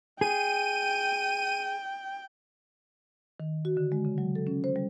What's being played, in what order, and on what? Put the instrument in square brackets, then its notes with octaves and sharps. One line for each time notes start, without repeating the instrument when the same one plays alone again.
[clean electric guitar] G#4 [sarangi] G5 [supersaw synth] D#7
[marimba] D#3
F#4
D3
G#3
C#3
F#3
A4
C#4
C5
G3